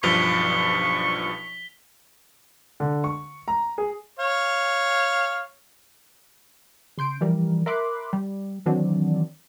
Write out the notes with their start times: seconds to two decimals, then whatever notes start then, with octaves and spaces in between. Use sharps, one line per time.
0.03 B1 G2 F3 C#6 B6 F7 G7
2.80 D3
3.04 C#6
3.48 A#5
3.78 G#4
4.19 C#5 F5
6.98 C#3 C6 G6 D7
7.21 E3 F3 G3 A#4
7.66 A#4 E5 B5 C6 D6 F#6
8.13 G3
8.66 D#3 E3 F#3 C4 D4